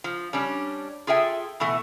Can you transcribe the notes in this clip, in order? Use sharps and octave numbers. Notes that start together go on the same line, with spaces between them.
F3
G3 C#4 D4
F4 G#4 A4 E5 G5
B2 E3 A3